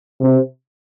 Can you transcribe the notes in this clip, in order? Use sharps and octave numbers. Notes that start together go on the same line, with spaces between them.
C3